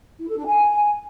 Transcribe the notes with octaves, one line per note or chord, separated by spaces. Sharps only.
E4
A4
D4
G#5